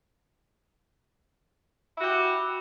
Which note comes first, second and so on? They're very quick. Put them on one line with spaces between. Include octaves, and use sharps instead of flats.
E4 F#4 G4